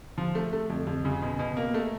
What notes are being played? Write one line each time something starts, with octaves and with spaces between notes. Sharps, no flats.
F3
A3
A3
F2
F2
C#3
B2
B2
A#3
A3